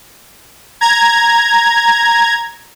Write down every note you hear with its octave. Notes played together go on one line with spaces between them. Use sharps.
A#5 G#6